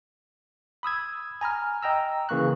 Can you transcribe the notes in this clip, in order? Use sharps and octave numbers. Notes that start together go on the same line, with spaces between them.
B5 D#6 E6 G#6
G#5 A#5 B5 F6
D#5 G5 A#5 E6
C#3 E3 A#3 C#6 F#6